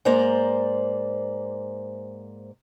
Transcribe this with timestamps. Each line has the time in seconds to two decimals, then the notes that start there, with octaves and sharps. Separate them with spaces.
0.05 G#2 A#3 C5 D5 A#5